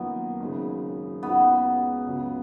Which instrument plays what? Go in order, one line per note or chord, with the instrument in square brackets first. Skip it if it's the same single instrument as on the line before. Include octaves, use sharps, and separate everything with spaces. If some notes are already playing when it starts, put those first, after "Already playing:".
Already playing: [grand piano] F#2 D#3 A#3 F4 [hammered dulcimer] B3
[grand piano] G#1 F#2 C#3
[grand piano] C#2 C#3 G#3 D#4 F#4 [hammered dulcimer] B3
[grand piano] C#2 C#3 F#3